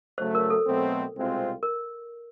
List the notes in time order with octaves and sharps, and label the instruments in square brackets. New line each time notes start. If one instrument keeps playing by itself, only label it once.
[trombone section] C#3 F#3 A3 [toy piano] C5
[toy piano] A#4
A4
[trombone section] B2 F#3 A3 C4
C2 B2 G#3 C4 F4
[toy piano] A#4